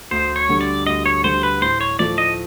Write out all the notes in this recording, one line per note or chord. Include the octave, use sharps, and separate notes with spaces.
D2 C5
C#5
D3 G3
D5
D2 D#5
C#5
D3 G3 C5
B4
A2 C5
C#5
F3 A3 D5
D#5